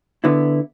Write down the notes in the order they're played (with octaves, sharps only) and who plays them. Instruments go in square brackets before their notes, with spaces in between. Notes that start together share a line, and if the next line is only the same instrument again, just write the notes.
[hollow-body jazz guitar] D3 B3 E4